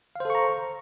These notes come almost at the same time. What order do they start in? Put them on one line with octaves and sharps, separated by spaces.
F5 C5 A4 C#6 A#5